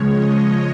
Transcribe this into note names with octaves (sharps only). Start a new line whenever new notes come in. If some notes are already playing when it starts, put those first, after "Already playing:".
Already playing: C#3 F3 G#3 C#5
D#5